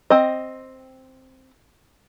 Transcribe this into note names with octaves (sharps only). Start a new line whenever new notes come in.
C4 D#5